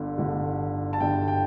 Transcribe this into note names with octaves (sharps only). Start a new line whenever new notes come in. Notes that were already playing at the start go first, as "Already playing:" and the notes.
Already playing: G1 G2 D3
G1 G2 D3
A5
G1 G2 D3 G5
G5